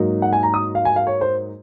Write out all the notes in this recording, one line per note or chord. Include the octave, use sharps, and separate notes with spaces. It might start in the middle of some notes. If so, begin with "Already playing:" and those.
Already playing: G#2 F#3 A#3 D#4
F#5
G#5
A#5
D#6
F5
G#5
F5
C#5
C5